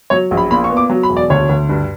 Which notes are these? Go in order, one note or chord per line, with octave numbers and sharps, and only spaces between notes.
F#3 C#5
A#1
B5
A#2 B5
C#6
B3
D6
F#3
B5
E1
D5
D2 C#5
D2
G2